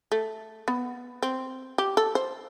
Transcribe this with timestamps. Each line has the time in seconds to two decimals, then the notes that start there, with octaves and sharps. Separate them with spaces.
0.12 A3
0.68 B3
1.23 C4
1.78 G4
1.97 A4
2.15 C5